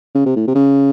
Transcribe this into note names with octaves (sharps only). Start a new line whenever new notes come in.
C#3
C3
A2
C3
C#3